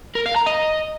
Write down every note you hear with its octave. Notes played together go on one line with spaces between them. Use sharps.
A#4
F5
A#5
D#5